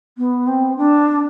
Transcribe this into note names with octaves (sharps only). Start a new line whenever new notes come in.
B3
C4
D4